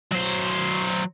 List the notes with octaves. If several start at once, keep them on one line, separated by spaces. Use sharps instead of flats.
F#3 C5